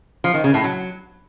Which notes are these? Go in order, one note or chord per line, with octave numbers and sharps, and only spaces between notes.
F3
D#3
C#3
A2
F#3